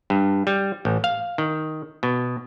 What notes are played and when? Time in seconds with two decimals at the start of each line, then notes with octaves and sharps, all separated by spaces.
0.10 G2
0.47 G3
0.85 A1
1.04 F5
1.38 D#3
2.03 B2